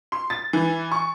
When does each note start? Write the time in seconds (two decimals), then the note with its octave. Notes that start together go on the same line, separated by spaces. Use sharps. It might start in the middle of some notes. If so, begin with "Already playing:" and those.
0.12 C6
0.30 A6
0.53 E3
0.92 C#6